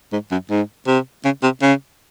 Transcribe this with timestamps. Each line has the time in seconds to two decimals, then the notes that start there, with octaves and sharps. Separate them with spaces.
0.13 G#2
0.31 F#2
0.50 G#2
0.87 C3
1.24 C#3
1.43 C3
1.62 C#3